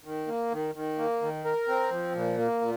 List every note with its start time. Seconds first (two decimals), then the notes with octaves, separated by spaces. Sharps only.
0.04 D#3
0.27 A#3
0.52 D#3
0.75 D#3
0.98 A#3
1.22 D#3
1.45 A#4
1.68 C4
1.91 F3
2.15 A#2
2.38 A#3
2.61 A#2